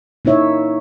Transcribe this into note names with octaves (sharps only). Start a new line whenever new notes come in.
A#3 D#4 E4 C#5 E5